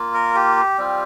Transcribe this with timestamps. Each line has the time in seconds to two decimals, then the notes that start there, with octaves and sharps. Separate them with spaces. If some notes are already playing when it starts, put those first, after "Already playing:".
Already playing: A#3 F4
0.14 A#4
0.36 G4
0.78 G3 C4 F4